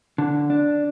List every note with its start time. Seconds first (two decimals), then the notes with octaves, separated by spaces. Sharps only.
0.18 D3
0.50 D4